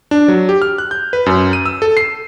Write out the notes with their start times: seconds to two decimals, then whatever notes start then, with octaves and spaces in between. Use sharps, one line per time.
0.11 D4
0.28 F#3
0.49 G4
0.62 F6
0.78 F#6
0.91 G6
1.13 B4
1.26 F#2
1.53 D#7
1.66 E6
1.82 A4
1.97 C7